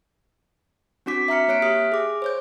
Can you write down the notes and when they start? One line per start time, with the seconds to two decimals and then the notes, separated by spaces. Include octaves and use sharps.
1.06 C4 D4 F#4 D6 B6
1.28 E5 A#5 F6 C#7
1.48 A#3 C#5 F#6 B6 D7
1.62 G4 E5 D#6 F6
1.92 G#4 D6
2.22 C5 C#5 G6